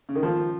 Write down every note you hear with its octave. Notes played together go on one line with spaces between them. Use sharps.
C#3
D#3
F3